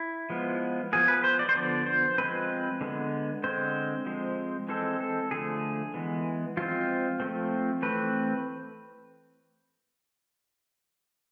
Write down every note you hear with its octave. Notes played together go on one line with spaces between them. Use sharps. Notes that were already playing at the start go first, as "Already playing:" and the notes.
Already playing: E4
F3 G#3 B3
F3 B3 G#4
B4
C5
D5
C5
D3 F3 B3 D5
C5
F3 G#3 C4 B4
D3 G#3 B3
D3 G#3 C4 C5
F3 G#3 C4
E3 G#3 C4 A4
A4
D3 F3 A3 G#4
E3 G#3 B3
F3 G#3 C4 F4
F3 A3 C4
E3 A3 C4 B4